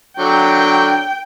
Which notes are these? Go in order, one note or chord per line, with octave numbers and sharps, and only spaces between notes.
D3 F#3 G5